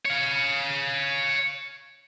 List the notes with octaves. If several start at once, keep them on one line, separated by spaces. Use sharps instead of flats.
C#5 F5